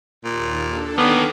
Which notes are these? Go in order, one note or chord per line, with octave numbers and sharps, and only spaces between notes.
D#2 A#2
D4 A4
D#3 A#3 B3 C#4